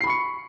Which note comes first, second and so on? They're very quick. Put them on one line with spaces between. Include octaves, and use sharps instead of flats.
C7 B5 C#6 C#7